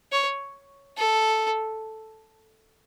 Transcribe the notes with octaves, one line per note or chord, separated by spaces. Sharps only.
C#5
A4